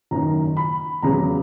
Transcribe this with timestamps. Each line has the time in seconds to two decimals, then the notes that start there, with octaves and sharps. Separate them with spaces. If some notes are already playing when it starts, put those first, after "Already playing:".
0.11 F#1 F#2 D#3 A#5
0.57 B5
1.02 E2 C#3 F#3 A#5